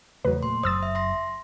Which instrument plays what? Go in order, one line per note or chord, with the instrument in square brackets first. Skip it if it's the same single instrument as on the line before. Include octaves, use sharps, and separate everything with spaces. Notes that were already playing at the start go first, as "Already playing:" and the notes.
[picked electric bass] E2 C#3 [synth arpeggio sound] F#3 B4 [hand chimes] A3
[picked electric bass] A#2 [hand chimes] C6
[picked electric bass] F#1 F#2 F#3 [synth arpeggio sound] C5 E6 A6 [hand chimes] D#6
[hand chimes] E5
C6 A#6